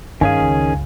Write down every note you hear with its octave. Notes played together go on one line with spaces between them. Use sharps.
G2 D#3 C#4 G#4 F5 G#5
C#2 F#2